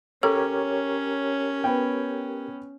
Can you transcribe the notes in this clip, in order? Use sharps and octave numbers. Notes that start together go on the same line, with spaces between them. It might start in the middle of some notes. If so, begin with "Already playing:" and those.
C#4 G4 A4 A#4 C#5
B3 G5